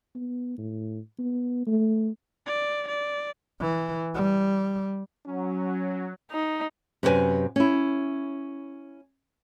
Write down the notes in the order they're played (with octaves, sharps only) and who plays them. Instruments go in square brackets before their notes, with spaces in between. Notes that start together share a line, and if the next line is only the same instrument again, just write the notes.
[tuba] B3
A2
B3
A3
[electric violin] D5
D5
[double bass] E3
G3
[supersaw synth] F#3 [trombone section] C#4
[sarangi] D#4
[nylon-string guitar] F#2 C3 F#4 B4 G#5
C#4 E4